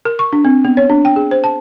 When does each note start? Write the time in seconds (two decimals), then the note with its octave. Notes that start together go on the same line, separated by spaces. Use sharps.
0.05 A#4
0.19 C#6
0.33 D4
0.45 C4
0.65 B3
0.77 C#5
0.90 D4
1.05 G5
1.16 G#4
1.31 C5
1.44 A5